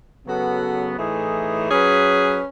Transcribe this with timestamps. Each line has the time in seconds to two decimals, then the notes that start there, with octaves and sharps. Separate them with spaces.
0.24 C#3 F#3 B3 F#4 A4
0.97 A2 E3 A3 D#4 G#4
1.70 F#3 C#4 G#4 B4